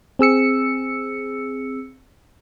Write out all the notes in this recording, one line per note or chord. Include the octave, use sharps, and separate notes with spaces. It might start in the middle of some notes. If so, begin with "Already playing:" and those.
C4 G#4 E6 C#7